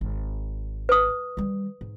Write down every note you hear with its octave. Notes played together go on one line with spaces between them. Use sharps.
G#1
B4 D#6
D#3 G3
G#2